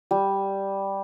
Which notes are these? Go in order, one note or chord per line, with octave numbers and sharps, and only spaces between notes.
G3